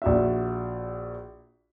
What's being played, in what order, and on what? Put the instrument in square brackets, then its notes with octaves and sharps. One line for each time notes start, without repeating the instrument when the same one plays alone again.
[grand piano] A#1 F#4 E5